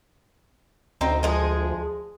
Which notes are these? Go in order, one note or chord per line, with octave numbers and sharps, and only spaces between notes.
D2 C4 D#4
F3 G#3 G#4